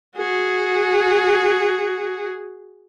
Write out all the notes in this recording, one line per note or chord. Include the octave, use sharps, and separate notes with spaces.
F#4 G#4